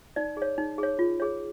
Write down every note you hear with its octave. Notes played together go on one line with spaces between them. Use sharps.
D#4 D5
G#4 C#5
D#4
G#4 C#5
F4
G#4 C#5